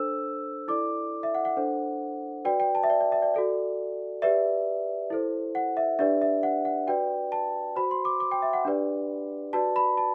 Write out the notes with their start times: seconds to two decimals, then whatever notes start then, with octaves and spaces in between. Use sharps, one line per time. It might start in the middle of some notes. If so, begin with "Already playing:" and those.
Already playing: D4 A4 C5 E6
0.68 E4 A4 D5 D6
1.23 E5
1.35 F#5
1.45 F#5
1.57 D4 A4 C5
2.45 F#4 B4 D5 G5
2.60 G5
2.75 A5
2.83 E5
2.90 D5
3.00 D5
3.12 E5
3.22 D5
3.34 F#4 A4 D5
4.22 G4 B4 D5 E5
5.10 E4 A4 C5
5.55 F#5
5.77 E5
5.99 D4 G4 B4 D5 E5
6.22 E5
6.43 F#5
6.65 F#5
6.87 F#4 B4 D5 G5
7.32 A5
7.76 F#4 C5 B5
7.91 C6
8.05 D6
8.20 D6
8.31 G5
8.42 E5
8.53 F#5
8.65 D4 G4 B4 D5
9.53 F#4 B4 D5 A5
9.76 B5
9.97 A5